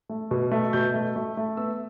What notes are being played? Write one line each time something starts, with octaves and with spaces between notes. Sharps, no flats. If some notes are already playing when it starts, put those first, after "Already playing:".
A3
B2
A3
B2 G6
A3
A3
A3
B3 E6